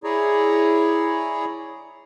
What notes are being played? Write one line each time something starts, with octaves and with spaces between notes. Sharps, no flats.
E4 G#4 C#5 D5 A#5